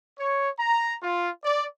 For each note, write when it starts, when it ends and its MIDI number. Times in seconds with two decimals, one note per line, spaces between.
0.19 0.50 73
0.58 0.96 82
1.02 1.29 65
1.44 1.67 74